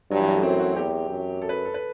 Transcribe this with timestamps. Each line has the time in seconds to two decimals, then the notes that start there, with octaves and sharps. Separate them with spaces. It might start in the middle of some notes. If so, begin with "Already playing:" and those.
0.11 G2 F#3
0.19 E3
0.28 F#3
0.35 A3
0.43 F#2 C4
0.59 F#4
0.76 E2 G4
1.09 F#2
1.42 A4
1.49 B4
1.65 A4
1.74 B4